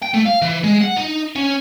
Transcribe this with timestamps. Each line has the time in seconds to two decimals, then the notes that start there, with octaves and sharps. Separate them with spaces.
0.02 G5
0.14 A3
0.26 F5
0.42 E3
0.64 G#3
0.81 F#5
0.97 D#4
1.36 C#4